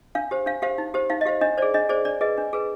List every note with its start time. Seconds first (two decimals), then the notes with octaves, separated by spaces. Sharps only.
0.15 D4 F5
0.31 G4 C5
0.46 D4 F5
0.62 G4 C5 F5
0.78 D#4
0.94 G4 C5
1.10 D#4 F5
1.21 D#5
1.25 G4 C5 F5
1.41 D4 D#5
1.58 G#4 C5 D5
1.74 D4 D#5
1.89 G#4 C5 D5
2.05 D4 D5
2.21 G#4 B4 D#5
2.38 D4
2.53 G#4 B4